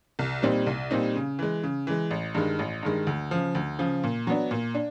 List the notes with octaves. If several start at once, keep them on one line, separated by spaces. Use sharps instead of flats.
C2
A#2 G3 C4 D#4
C2
A#2 G3 C4 D#4
C#3
E3 G#3
C#3
E3 G#3
A1
G2 D#3 G#3
A1
G2 D#3 G#3
D2
C#3 F3
D2
C#3 F3
A#2
F#3 B3 D4
A#2
D4